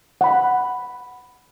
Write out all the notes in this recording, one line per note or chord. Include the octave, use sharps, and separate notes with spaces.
F#5 B5